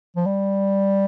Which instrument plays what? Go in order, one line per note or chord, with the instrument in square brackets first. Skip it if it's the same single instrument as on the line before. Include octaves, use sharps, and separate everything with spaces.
[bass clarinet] F3
G3